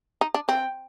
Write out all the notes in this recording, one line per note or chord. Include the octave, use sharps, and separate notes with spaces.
D#4
D4
C4 G5